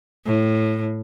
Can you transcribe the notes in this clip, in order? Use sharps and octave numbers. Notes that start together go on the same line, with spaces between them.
A2